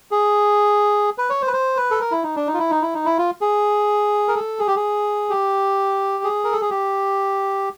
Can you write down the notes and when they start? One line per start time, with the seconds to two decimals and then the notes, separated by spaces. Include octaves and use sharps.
0.11 G#4
1.18 B4
1.30 C#5
1.42 C5
1.47 B4
1.53 C5
1.77 B4
1.91 A4
2.01 A#4
2.11 E4
2.23 D#4
2.36 D4
2.47 D#4
2.54 F4
2.59 E4
2.71 D#4
2.82 E4
2.94 D#4
3.05 E4
3.18 F4
3.41 G#4
4.28 A#4
4.36 A4
4.59 G#4
4.67 G4
4.76 G#4
5.30 G4
6.24 G#4
6.44 A#4
6.52 A4
6.61 G#4
6.70 G4